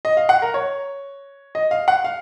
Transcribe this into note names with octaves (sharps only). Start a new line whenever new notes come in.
D#5
F5
F#5
A#4
C#5
D#5
F5
F#5
F5